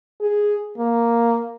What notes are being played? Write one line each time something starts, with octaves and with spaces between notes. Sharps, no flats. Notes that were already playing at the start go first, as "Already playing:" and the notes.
G#4
A#3